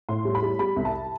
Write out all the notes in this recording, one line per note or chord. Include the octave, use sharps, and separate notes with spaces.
A2 C6
G3
B5
G3
G3 B5
C2
A5